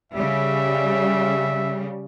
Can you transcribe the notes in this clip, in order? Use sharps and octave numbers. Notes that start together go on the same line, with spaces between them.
C#3 G3 E5